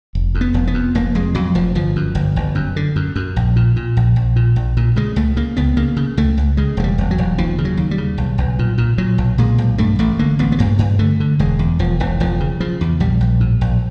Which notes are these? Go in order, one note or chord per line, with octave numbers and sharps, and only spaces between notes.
F1
F2
B3
F1
B3
F2
F1 A#3
F2 G#3
F2 F#3
F1 F3
G1 F3
F#2
G1
G1
F#2
D3
F#2
F#2
A#1
A#2
A#2
A#1
A#1
A#2
A#1
A#2
C#3 G#3
C#2 A3
C#3 A#3
C#2 B3
C#3 A#3
C#3
C#2 A3
C#2
C#3 G#3
E1 G#3
G3
E1
F#3
E1
D#2 F3
C#3
F#3
D#2
G3
C#3
B1
B1
A#2
A#2
A#2 F#3
B1
A#2 G#3
B1
G2 A3
A1 A3
D3 A#3
A1 B3
B3
G2 A#3
G2
D3 A3
D3
E1 G#3
E2
E1 F3
E1 E3
E1 F3
C#3
C#3 F3
E2
A#1 G3
A#1
A2
A#1